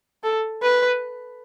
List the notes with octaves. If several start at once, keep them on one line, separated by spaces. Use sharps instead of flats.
A4
B4